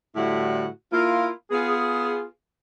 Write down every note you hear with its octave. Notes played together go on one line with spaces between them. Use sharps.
A2 D3 G3 E4 F#4
A#3 E4 F4
B3 F4 G#4